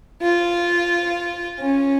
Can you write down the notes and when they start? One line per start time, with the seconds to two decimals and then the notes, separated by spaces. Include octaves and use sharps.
0.22 F4
1.60 C#4